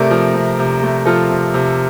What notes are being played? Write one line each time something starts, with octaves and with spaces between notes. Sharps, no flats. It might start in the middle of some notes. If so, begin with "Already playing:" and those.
Already playing: C3 A3 A#4 D5
F3
C3
C3
A3
F3 F4 A4
C3
C3